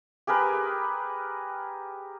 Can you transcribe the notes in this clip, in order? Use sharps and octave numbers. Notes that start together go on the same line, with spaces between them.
G4 G#4 A#4 B4